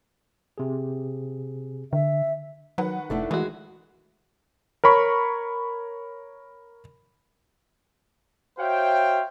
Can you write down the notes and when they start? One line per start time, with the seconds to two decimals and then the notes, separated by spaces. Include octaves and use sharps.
0.58 C3 G#4
1.93 D3 E5
2.78 D#3 F#3 B4 F#5
3.10 F1 A3 D4 E4
3.31 E3 G#3 F#4
4.84 A#4 C#5 B5 C#6
8.59 F#4 C5 C#5 E5 F5 G5